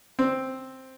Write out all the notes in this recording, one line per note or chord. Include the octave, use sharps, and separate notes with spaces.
C4